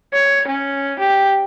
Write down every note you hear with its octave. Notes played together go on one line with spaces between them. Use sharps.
C#5
C#4
G4